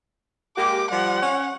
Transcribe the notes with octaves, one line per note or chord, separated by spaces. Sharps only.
G#3 A#3 G4 D6
F3 G3 F#5
C#4